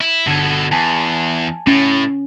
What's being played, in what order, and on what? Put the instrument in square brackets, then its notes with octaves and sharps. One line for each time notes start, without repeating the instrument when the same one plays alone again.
[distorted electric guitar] E4
[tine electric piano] G1 D3 G#6 [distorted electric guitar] B2 A4
[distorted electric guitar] E2 [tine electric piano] G#5 A5
[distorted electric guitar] A2 [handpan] C#4